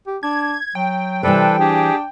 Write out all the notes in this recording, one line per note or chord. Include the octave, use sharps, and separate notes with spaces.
G4
D4 G#6
F#3 G5
C3 E3 G3 D4 A4 B4 C5
D4 G4 G#4